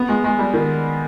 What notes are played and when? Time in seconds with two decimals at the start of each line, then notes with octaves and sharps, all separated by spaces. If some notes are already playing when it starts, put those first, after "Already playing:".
Already playing: B3
0.09 G#3
0.24 G#3
0.39 G3
0.54 D#3